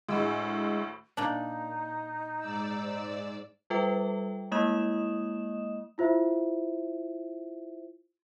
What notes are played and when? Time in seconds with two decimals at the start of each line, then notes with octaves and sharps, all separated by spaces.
0.09 D2 A2 G#3 E6
1.17 A#2 D4 D#4
2.40 G#2 D5 E6
3.70 G3 F4 A4 B4 E5 G5
4.52 G#3 A#3 E4 D#5 D#6 E7
5.98 E4 F4 C5 E5